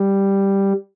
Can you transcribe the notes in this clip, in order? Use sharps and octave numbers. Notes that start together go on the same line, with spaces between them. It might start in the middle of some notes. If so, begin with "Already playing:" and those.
Already playing: G3